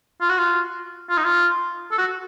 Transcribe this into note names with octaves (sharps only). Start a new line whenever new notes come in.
F4
F#4
F4
F4
D#4
F4
A4
F#4